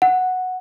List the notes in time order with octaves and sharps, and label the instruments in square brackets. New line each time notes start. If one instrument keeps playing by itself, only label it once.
[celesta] F#5